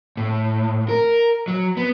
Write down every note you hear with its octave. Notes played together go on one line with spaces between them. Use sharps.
A2
A#4
F#3
B3